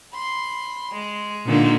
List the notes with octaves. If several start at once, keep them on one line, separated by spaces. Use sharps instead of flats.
B5 C6
G#3
A#2 D3 D#3 G#3 A#3